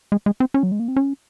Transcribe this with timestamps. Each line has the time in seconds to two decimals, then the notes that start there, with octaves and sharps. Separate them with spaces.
0.12 G#3
0.26 G#3
0.40 C4
0.54 C#4
0.63 F#3
0.72 G#3
0.80 A#3
0.88 C4
0.96 C#4